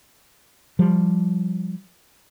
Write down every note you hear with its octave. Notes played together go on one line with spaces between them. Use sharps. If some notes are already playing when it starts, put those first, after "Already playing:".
F3 G3